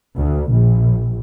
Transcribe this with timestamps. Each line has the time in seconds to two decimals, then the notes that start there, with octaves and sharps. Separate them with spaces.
0.17 D2
0.51 A#1